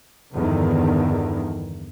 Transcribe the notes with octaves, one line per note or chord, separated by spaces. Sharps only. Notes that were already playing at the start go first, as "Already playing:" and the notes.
E2 G2 D3 D#3